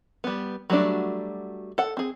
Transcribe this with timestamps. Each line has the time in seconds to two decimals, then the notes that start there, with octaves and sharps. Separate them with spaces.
0.24 G3 B3
0.70 F#3 G3 A3 D4 F#4
1.78 A4 F#5
1.97 C4 G#4